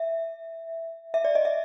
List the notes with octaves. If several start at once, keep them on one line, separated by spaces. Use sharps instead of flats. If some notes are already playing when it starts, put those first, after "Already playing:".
Already playing: E5
E5
D5
D#5
E5